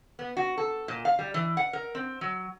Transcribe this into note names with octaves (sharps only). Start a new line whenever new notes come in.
B3
F#4
A4
A#2
F5
G3
E3
F#5
A#4
C4
F#3